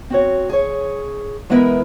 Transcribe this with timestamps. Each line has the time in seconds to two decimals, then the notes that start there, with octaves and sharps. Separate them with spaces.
0.10 C4 F#4 C#5
0.49 G#4 C#5
1.50 E3 G#3 B3 E4 A#4 B4